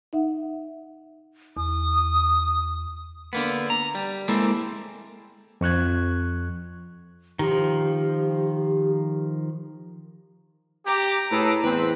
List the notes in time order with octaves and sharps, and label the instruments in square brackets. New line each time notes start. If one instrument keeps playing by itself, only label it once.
[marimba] D#4 E5 F#5
[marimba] E2 [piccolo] D#6
[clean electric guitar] D3 A#3 B3
A#5
G3
G#3 A#3 C4 E4 A4
[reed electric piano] F2 C#6 F#6 G#6
[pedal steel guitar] D#3 F3 [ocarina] G4
[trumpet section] G4 [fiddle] A#5 D6
[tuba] A2 [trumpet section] G#4 A4 B4
[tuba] E2 [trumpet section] C4 [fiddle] B4